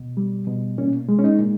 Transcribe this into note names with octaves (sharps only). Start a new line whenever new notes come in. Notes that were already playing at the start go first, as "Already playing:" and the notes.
Already playing: B2
G3
B2
A#2 C#4
G#3
C#4
D#4
A#2